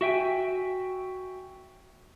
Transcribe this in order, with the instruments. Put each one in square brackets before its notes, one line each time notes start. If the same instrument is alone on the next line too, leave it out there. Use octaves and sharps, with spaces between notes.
[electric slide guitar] F#4 E5 G5 G#5